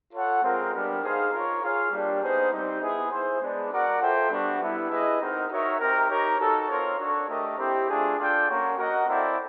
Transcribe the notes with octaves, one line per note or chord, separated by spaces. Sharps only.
F4 A4 C#5 F#5
G#3 C4 F4 A#4
G3 B3 D4 G4 A#4
D#4 G#4 C5 F5
F4 A#4 C#5
F4 G#4 C#5 F5
G3 A#3 D4 G4
B3 D#4 G#4 C5
G3 C4 D#4
B3 E4 G#4
E4 G#4 C5
G#3 B3 D4
F#4 A#4 D5 F#5
F4 A4 C5 E5 G5
G3 B3 D4 F#4
G3 B3 E4
E4 G#4 B4 D#5
C4 D#4 F#4 A#4
D#4 F#4 A#4 C#5 E5
C4 D#4 G4 A#4
D#4 G4 A#4 C#5
D#4 F#4 A4
C4 F4 A#4 C#5
D4 F#4 A4 C#5
A3 D4 G4 A#4 D#5
C4 E4 G4
A3 D4 F4 G#4
D4 F4 A4 D5 G5
A#3 C#4 F#4 A#4 C#5
F#4 A#4 D#5 F#5
C4 E4 A4 D5 G5